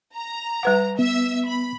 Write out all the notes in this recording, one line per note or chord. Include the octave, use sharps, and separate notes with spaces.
A#5
G3 B4 F#5
B3 E5 E6
B5